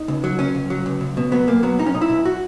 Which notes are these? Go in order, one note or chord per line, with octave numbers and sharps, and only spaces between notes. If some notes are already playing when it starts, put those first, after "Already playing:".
Already playing: D#4
C#2
F#3
C#2 C#4
C#2
F#3
C#2
C#2
B2
F#3 B3
B1 A#3
F#3 B3
B1 D#4
C#4
B1 D#4
E4
B1
F#4